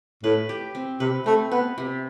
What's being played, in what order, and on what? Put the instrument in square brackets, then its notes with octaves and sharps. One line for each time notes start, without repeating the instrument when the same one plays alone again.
[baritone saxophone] A2 [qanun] B4
[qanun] G4
C4
[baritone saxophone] C3 [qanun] B4
[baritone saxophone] A3 [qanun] C4
[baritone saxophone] B3 [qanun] B4
[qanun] C3